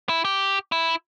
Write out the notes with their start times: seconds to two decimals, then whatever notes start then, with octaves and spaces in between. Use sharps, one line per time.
0.09 E4
0.25 G4
0.72 E4